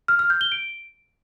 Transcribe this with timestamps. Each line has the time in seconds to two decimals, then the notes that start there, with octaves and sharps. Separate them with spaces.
0.08 F6
0.19 F6
0.30 G6
0.41 G7
0.52 D7